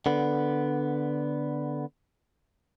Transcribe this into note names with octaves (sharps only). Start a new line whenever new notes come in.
D3 B3